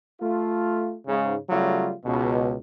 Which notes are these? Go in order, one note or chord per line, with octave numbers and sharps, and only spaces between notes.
A3 F4
G#2 C#3
C#3 F#3 G3 A3 F4
C#2 B2